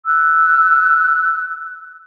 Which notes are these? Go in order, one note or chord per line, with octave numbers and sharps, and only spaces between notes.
E6 F#6